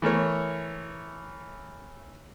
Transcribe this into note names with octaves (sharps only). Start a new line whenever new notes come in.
E3 A3 A#4 C#5